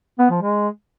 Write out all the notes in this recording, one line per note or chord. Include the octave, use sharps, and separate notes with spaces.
B3
F3
G#3